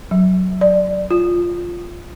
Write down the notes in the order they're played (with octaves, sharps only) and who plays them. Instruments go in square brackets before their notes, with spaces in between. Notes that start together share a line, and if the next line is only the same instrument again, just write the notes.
[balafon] F#3
D5
F4